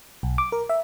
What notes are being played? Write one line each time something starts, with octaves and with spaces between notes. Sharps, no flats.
B1
D6
A#4
E5